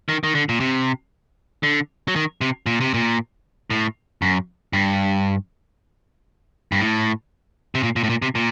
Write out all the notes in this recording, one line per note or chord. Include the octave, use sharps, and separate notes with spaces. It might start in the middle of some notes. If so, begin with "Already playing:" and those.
D#3
D#3
D3
A#2
C3
D3
F#3
D#3
C3
A#2
C3
A#2
A2
F#2
G2
G2
A2
C3
A#2
A#2
A2
A#2
C3
A#2